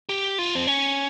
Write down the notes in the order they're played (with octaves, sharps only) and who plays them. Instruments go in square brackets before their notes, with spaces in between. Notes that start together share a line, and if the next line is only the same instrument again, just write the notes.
[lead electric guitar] G4
F4
C4
C#4